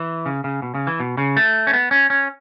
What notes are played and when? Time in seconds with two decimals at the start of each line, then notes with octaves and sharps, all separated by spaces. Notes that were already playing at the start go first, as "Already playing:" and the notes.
Already playing: E3
0.26 C#3
0.44 C#3
0.62 B2
0.74 C#3
0.87 E3
1.00 B2
1.17 C#3
1.37 A3
1.67 C#4
1.73 B3
1.91 C#4
2.10 C#4